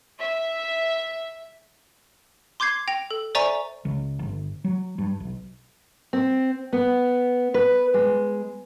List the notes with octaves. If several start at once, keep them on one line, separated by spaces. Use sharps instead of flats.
E5
C6 D6 G6 G#6 C7
G5 A#6 F7
A4
C5 D5 E5 G#5 A#5 C#6
C#2
G1
F#3
G2
B1
C4
B3
B4
G#3